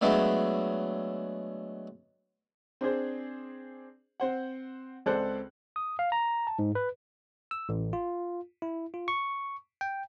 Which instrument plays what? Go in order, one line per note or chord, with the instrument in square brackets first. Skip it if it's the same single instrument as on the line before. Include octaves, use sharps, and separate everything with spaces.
[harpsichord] D3 F#3 G#3 A3 B3
[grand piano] C4 D4 G#4 C5
C4 C5 F#5
C#2 C4 A4 C5 D5 F#6
[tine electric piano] D#6
F5
A#5
A5
G#2
B4
E6
A1
F4
E4
F4
C#6
G5